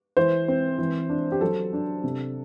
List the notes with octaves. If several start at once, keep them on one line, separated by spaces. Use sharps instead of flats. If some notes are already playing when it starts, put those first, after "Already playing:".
E3 C5
C4
E3
D4
G4
F#3 A4
D4
C3